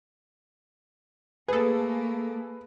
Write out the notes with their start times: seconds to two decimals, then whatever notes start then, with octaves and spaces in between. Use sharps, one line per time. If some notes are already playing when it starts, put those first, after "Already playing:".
1.48 A3 A#3 G#4 A4 B4